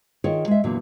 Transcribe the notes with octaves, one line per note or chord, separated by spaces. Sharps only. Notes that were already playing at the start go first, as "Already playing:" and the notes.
D#3 F4 G#4 C#5
G#3 E5
E2 A#2 D3 F#3